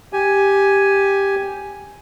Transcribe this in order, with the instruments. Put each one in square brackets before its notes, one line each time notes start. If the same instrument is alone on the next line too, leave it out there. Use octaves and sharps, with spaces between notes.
[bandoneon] G4 G#5